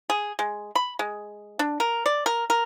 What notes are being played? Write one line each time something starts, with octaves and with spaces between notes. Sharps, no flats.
G#4
G#3
B5
G#3
D4
A#4
D5
A#4
A#4